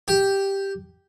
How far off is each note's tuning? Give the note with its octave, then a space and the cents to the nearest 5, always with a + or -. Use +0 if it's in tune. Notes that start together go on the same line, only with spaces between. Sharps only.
G4 +0